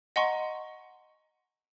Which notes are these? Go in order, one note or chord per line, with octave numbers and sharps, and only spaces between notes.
D#5 F#5 G#5 A#5 C6 C#6